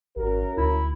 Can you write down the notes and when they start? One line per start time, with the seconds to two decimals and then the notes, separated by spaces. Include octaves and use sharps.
0.16 G#1 F#2 F#4 A#4
0.57 D2 E4